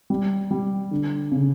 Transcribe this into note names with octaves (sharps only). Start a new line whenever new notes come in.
G3
G3
D3
C#3